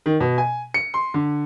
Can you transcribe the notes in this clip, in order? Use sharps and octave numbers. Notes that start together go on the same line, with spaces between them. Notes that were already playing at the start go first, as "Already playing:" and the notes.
D#3
B2
G#5
C#7
C6
D3